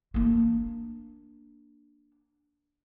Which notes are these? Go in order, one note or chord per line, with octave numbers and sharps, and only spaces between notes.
A#3 D4